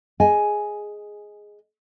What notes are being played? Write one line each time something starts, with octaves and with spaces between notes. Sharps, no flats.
G#4 D#5 G#5